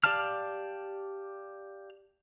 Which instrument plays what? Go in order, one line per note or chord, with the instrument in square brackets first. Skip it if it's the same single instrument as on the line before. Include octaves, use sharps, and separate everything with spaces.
[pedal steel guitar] G4 D5 F5 A5 F6